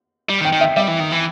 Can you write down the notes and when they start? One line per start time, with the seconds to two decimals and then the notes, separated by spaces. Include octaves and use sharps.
0.29 G3
0.40 D#3
0.45 G5
0.52 D#3
0.61 E5
0.77 G3 E5
0.88 E3
1.00 D#3
1.12 E3